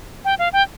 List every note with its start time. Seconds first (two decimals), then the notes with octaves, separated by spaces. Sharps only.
0.25 G5
0.39 F5
0.53 G5